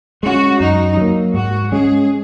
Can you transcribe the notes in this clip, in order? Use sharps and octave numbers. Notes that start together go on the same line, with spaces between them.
G#3 C#4 F#4
F#2 D#4
F#3 A#3
G#2 F#4
G#3 C#4 G#4